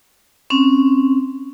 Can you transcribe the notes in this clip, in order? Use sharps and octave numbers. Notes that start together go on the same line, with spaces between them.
C4 C#4